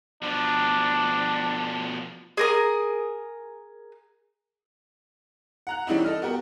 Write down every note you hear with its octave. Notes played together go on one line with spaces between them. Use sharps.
B2 F3 D4
G#4 A#4 D#6
F#5 A#5 F#6
E3 G3 C4 C#4 D#4 E4
A4 D#5 F6
B3 F#4 G4 A#4